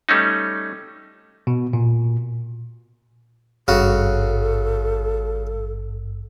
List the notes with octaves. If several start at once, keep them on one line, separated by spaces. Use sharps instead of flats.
G3 A3 C#4 D#4
B2
A#2
G#1 G2 C#3 F#4 A4